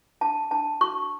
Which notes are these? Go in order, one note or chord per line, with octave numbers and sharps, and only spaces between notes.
D4 A5
D4 A5
F#4 C#6